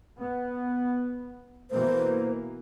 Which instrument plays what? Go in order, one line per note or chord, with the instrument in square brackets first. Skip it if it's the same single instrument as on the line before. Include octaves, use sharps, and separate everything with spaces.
[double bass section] B3
[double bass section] B2 E3 A#3 [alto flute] C5